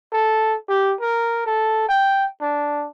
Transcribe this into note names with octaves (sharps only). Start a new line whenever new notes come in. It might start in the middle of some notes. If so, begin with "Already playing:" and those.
A4
G4
A#4
A4
G5
D4